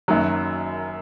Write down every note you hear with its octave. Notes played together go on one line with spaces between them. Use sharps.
F#1 F#2 D#3 F#3